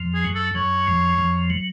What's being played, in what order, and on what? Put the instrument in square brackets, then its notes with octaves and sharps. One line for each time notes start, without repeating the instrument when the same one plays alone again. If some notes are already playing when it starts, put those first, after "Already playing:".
Already playing: [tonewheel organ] F2 F3
[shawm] G#4
[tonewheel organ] F#2 F#3
[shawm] A4
[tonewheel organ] F#2 F#3 [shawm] C#5
[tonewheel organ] F2 F3
F2 F3
F#3